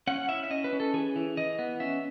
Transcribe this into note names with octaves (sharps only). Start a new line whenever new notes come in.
C#4 F#5
E4 E5
E5
C#4 D#5
B4
C#4
A4
E3 G#4
E3
E3 D#5
B3
C#4 E5